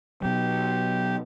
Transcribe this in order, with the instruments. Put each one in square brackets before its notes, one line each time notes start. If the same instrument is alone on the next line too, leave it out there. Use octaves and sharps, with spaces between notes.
[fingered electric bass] B2 F#3 [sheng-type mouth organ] G4